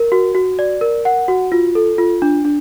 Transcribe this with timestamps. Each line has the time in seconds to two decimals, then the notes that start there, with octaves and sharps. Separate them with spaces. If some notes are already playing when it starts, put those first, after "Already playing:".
Already playing: A#4
0.12 F#4
0.35 F#4
0.59 D5
0.81 A#4
1.05 F#5
1.28 F#4
1.52 F4
1.75 A4
1.98 F4
2.22 D4
2.45 D4